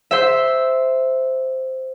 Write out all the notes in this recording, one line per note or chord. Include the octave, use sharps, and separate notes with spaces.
C5 E5